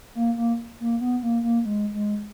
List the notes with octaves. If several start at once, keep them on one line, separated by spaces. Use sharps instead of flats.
A#3
A#3
A#3
B3
A#3
A#3
G#3
G#3